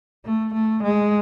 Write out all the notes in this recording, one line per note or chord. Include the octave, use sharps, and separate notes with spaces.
A3
A3
G#3